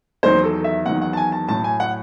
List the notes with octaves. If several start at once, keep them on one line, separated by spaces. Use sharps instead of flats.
E2 D#3 F#3 C5
A4
E5
E2 D#3 F#3 F#5
F#5
A5
G#5
A5
A2 F#3 A5
G#5
F#5